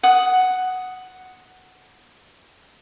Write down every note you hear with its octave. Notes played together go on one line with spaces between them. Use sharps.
F#5 D#6